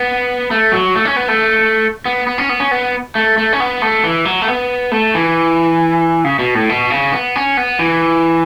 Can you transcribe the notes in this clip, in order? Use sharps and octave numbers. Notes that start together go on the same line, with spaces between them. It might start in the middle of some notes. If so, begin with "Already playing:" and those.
Already playing: B3
A3
F#3
A3
C#4
B3
A3
B3
B3
C#4
B3
C#4
B3
A3
A3
C#4
B3
A3
E3
F#3
A3
B3
A3
E3
C#3
B2
A2
B2
C#3
B3
C#4
B3
E3